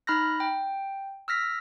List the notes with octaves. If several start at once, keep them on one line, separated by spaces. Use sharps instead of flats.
D#4 B5 F6 F#6 A#6
G5
E6 F6 A#6 B6